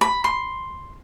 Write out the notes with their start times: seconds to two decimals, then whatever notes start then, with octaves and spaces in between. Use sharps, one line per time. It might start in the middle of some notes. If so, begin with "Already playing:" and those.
0.01 B5
0.24 C6